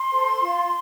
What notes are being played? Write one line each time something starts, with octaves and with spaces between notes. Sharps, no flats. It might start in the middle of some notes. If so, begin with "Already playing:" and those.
Already playing: C6
A4 C5
F4